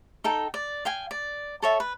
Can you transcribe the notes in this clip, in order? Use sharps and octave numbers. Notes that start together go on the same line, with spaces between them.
D#4 A4 G5
D5
F5 G5 G#5
D5
A4 C#5 E5
B4